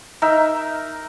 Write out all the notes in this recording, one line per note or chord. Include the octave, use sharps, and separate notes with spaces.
D#4 A#4 E5